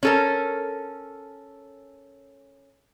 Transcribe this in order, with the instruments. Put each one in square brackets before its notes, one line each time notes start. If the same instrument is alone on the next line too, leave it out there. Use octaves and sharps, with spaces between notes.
[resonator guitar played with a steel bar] C#4 A4 A#4